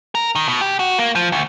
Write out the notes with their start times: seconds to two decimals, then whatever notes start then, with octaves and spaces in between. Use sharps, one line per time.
0.15 A#4
0.35 D#3
0.48 B2
0.61 G4
0.79 F#4
0.99 A#3
1.15 F3
1.32 D2